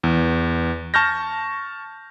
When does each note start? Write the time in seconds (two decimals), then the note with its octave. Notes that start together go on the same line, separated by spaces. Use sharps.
0.04 E2
0.94 A5 C#6 F6 G6 A#6